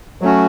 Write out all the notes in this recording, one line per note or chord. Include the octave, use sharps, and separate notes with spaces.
F#3 A3 C#4 F#4